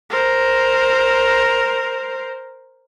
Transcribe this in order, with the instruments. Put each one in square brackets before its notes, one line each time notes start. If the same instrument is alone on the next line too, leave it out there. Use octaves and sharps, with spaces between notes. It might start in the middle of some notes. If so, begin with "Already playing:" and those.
[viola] A#4 C5